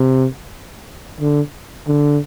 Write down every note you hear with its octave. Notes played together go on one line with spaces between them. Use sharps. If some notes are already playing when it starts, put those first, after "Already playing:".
Already playing: C3
D3
D3